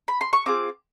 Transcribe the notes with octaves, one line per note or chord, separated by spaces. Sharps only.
B5
C6
C#6
C4 F4 G#4 D6